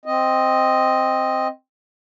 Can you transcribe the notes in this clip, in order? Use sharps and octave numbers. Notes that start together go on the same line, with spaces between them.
C4 D#5